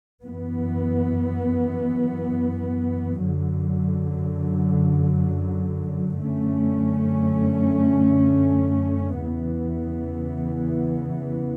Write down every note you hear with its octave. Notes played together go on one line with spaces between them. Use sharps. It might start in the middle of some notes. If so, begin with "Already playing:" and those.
F#2 E3 B3
F#2 D3 F#3
F#2 D3 A3 C#4
E2 C#3 E3 B3